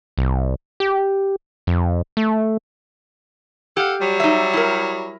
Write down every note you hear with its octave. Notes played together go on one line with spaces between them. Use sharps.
C2
G4
F2
A3
G4 A4 F5 F#5
F#3 G3
D#4 E5
E4 A#4